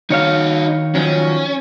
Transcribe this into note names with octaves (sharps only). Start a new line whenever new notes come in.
D#3 D#4 F#4 C#5 F5
D#3 F3 F#3 C#4